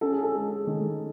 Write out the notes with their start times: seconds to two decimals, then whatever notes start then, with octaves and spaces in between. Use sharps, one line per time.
0.01 C#4 A4
0.12 G#4
0.23 A4
0.34 G#3
0.67 D#3